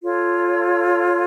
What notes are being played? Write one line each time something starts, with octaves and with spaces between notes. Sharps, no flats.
F4 A4 C#5